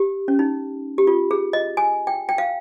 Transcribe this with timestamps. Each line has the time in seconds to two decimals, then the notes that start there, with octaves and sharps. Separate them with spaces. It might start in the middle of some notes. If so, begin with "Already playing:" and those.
Already playing: G4
0.28 C#4
0.39 D#4
0.98 G4
1.07 F4
1.31 G#4
1.53 D#5
1.77 G#5
2.07 G5
2.29 G5
2.38 F5